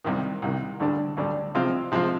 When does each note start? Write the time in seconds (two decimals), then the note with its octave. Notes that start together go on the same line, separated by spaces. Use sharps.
0.04 C2 C3 D#3
0.42 C2 C3 D#3
0.80 D2 D3 G3 D4
1.17 D2 D3 G3 D4
1.55 C3 F3 G#3 C4 F4
1.92 C3 F3 G#3 C4 F4